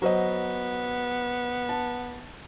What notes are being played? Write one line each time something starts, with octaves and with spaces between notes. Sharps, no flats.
F#3 B3 C5 D#5
A5